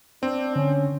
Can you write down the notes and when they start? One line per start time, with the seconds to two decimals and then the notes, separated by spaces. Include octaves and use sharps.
0.23 C4 D4
0.56 D3 C#4